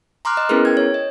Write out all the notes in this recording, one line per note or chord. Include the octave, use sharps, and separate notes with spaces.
A#5 C6 D6 F6 F#6
D#5
B3 C#4 E4 G#4 A#4 B4
G5 G#6
C#5
D#5